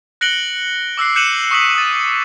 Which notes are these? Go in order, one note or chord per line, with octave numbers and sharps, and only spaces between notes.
F#6 A#6 C#7 D7 F#7 G7
D6 E6 F#6 C7
F#6 G6 C#7 D#7 E7 F#7
C#6 D#6 B6 F#7
D#6 A6